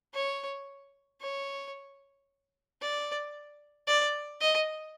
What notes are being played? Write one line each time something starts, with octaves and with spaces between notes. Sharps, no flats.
C#5
C#5
D5
D5
D#5